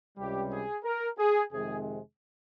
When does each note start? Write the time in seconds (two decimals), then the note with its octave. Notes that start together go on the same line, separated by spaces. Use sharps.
0.17 C#2 C3 G3 G4
0.51 G#4
0.84 A#4
1.18 G#4
1.52 F2 C3 D#3 G#3 C4 G#4